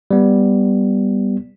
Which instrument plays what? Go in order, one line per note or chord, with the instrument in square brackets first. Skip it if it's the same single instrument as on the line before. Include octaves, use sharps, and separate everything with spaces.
[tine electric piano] G3 B3